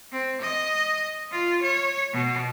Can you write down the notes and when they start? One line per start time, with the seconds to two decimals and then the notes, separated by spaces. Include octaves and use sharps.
0.12 C4
0.42 D#5
1.31 F4
1.62 C#5
2.13 B2